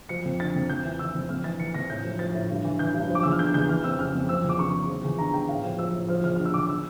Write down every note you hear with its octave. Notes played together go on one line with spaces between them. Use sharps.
F3 C#7
F2
D3 A6
F2
F2 G6
E3
E3 E6
F2
F2 F6
E3 A6
E3 C#7
F2 A#6
A2 G6
F3
F3 A6
A2
G2
E3
E3 G6
G2
F3
D6
E2 E6
F6
D3 G6
E2 G6
E3 F6
F2 E6
C#3 F6
F2
F3 E6
E2
D6
C#3 C#6
E2
F3
E2
D3 A#5
E2 G5
A2 F5
F3
F3 E6
A2
F3 F6
E2 F6
D3 F6
E6
E2 D6
E6